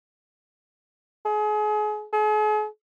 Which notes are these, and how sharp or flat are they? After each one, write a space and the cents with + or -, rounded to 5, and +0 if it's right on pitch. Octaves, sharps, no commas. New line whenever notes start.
G#4 +30
G#4 +40